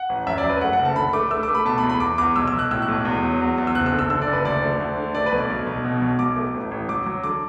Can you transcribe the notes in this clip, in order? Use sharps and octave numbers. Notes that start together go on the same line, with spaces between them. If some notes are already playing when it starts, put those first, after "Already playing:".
Already playing: F#5
A1
F#2 E5
D5
F#2
B4
A3 F#5
F#5
F#1
A5
D3 B5
A3 D6
A3 E6
D6
A3
B5
B2 A5
B5
E2
B5
E2 D6
E2 D6
B1 E6
E6
B1
F#6
A2 E6
F#6
B1
E2
F#3
E2
E2
E6
F#1 F#6
E6
D3
E6
D3 E6
D5
F#1
B4
D2 D5
D3
D2
D3
A3 D5
B4
B1
D5
B1
B1
B2
B1
B1 D6
A3
A1
A1
F#3 D6
F#3
D3 D6